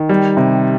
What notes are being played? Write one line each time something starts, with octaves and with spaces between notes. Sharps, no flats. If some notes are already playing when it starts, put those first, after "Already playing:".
Already playing: D#3
G3
C3